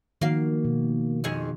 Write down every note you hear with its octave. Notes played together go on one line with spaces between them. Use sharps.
D#3 F3 A#3 F#4 F5
B2
F2 D#3 G#4